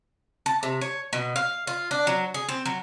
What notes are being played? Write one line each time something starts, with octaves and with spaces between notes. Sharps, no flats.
A5
C3
C#5
B2
F5
F4
D4
F#3
G#4
C4
F#3